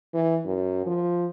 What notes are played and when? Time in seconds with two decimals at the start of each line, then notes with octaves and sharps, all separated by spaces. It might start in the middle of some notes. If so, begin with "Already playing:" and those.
0.14 E3
0.46 F#2
0.86 F3